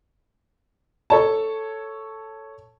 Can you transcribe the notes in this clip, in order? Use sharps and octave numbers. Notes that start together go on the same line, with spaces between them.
A4 C#5 A5